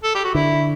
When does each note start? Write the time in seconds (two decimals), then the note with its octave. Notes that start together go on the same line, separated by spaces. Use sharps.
0.03 A4
0.15 G4
0.24 F#4
0.35 D3 E4